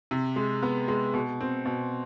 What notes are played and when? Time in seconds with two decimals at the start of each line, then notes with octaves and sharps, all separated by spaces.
0.11 C3
0.36 G#3
0.63 B3
0.88 G#3
1.14 B2
1.41 C4
1.65 B2